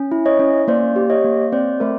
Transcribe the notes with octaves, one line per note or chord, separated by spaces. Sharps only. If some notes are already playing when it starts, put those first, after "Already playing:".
Already playing: C#4
E4
C#5 D#5
C#4
A#3 C5 D5
G4
C#5 D#5
A#3
C4 C5 D5
A3 A#4 C5